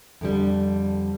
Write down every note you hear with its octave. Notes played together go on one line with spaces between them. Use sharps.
F2 D3 G3